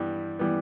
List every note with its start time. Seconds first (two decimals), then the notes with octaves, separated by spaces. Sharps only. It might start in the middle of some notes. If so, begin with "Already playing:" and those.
Already playing: G2 E3 G3 B3
0.39 E3 G3 B3